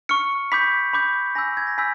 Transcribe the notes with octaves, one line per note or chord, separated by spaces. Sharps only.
C#6 F6 C#7
B5 D6 G6 B6
B5 D6 G6
G#5 B5 E6 G6 A#6
G#6
A#6
G#5 B5 E6 G6 B6